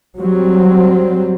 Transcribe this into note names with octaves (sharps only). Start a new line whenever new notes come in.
F#3 G3 C4